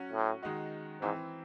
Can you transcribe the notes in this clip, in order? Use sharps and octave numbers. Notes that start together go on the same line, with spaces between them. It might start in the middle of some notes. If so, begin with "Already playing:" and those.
Already playing: F#3 C#4 F#4
A2
D#3 G#3 D#4 F#4
G#2 E3 C4 E4